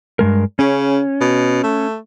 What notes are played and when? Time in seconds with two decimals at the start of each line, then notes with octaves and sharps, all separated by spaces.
0.19 G2 G#3 A#4
0.59 C#3 C#4
1.21 B2
1.63 A3